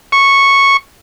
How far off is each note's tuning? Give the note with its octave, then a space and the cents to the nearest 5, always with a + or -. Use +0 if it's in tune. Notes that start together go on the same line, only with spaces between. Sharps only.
C#6 -5